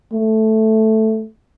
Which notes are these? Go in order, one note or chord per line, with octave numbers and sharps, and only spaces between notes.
A3